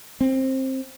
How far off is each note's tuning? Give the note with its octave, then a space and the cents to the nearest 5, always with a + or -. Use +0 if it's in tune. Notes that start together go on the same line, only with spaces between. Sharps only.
C4 +15